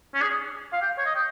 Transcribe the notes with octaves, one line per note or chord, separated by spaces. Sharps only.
C#4
G#4
F5
G5
C#5
D#5
G5